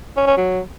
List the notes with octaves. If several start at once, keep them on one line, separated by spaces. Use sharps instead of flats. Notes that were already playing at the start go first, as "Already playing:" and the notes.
C#4
C#4
F#3